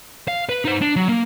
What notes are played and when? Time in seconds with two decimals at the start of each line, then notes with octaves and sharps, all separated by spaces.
0.28 F5
0.49 B4
0.65 D#4 C5
0.81 D4
0.96 F#3
1.08 A#3